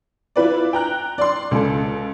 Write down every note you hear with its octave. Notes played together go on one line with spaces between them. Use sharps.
E4 F4 B4 D5
G5 A#5 F#6
D5 C6
C#2 A4